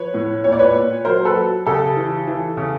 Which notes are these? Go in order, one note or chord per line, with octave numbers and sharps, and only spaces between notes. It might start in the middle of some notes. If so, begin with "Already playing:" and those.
Already playing: F3 B4 C#5
A2
A#2 C#5
D5
B4 C#5
A#2
F#3 A#4 C5
A4 B4
F#3
C#3 G4 A4
E3
E3
C#3